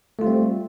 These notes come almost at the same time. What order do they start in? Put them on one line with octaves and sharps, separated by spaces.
A3 F4 G3 C4